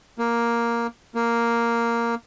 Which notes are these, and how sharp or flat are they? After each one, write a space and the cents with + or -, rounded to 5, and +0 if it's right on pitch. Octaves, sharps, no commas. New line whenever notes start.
A#3 +5
A#3 +0